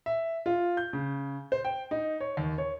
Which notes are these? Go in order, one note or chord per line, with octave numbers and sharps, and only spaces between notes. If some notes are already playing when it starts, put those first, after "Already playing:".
E5
F4
G6
C#3
C5
G5
D#4
C#5
D#2
C#5